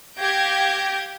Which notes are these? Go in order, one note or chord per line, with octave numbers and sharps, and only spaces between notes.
G4 F5 G6 G#6 A#6 D7